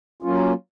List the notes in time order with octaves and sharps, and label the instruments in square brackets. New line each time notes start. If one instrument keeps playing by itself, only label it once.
[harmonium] F#3 A#3 C#4 F4